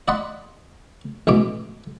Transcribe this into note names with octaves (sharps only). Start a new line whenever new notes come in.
D5 D#5 F#5 B5 C6
A1 B2 G#3 D6